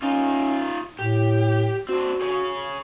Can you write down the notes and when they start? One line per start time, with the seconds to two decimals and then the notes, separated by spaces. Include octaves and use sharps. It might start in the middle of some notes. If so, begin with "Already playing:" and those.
0.02 C#4 D#4 F4
0.99 A2 G4
1.89 C4 D4 F#4
2.21 G#4 C#5